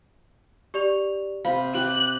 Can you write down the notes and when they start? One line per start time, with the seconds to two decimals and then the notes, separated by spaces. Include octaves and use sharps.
0.74 G4 D5 F7
1.45 C3 F5 B5
1.75 G4 F#6